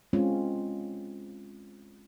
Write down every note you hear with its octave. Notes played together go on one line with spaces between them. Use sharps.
G#3 C4 C#4 F4